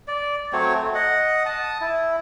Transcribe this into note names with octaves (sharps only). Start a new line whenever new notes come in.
D5
F#3 A3 C4 C#5
A3
D#5 F#5
A5 D#6
E4